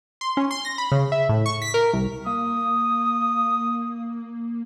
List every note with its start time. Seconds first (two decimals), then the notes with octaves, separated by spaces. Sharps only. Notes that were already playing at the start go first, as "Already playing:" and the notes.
0.21 C6
0.37 C#4
0.51 C6
0.65 A#6
0.78 B5
0.92 C#3
1.12 E5
1.29 A2
1.46 C#6
1.62 B6
1.74 A#4
1.93 C2
2.26 A#3 D#6